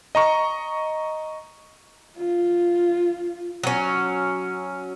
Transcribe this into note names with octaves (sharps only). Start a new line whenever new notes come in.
D#5 A#5 C#6
F4
F#3 C#4